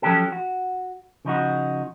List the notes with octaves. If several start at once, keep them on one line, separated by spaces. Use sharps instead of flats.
F3 F#3 C#4 G4 A4
F#4
C#3 F3 D#4 F#4